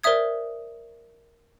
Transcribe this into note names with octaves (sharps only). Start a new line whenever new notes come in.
A#4 C5 D5 E5 D#6 G#6